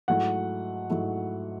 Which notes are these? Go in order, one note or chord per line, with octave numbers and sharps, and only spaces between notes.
G#2 F#3 A3 E4 F#5
G#2 F#3 A3 E4